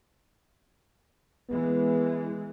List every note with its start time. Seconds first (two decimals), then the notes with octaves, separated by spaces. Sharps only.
1.50 E3 G#3 B3